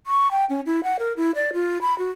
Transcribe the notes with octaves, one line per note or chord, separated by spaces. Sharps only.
C#6
G5
C#4
E4
F#5
A#4
E4
D5
F4
B5
F#4